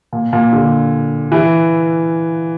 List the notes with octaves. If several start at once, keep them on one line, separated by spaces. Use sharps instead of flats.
A#2
A#2
D3
E3